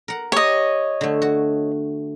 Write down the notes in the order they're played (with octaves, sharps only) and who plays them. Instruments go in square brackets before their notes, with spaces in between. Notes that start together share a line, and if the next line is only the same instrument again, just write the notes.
[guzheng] A#4 F#5
[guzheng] G4 [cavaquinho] C#5 D#5
[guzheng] D3 A3
F#4